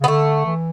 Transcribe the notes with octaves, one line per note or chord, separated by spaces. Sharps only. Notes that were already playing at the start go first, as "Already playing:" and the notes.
C#3
B3
D3 A3
E3